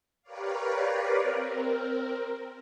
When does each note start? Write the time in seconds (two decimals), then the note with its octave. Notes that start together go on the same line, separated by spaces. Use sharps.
0.22 G4 A#4 B4 C#5 D5 F5
1.21 C4 A#4